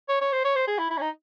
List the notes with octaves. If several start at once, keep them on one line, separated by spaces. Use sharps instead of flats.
C#5
C#5
C5
C#5
C5
G#4
E4
E4
C#4
D#4